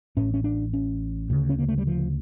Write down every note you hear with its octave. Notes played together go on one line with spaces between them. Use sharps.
A1 A2 C#4
C#4
D4
C#4
D2 C#3
C#4
A#3
A3
G3
F3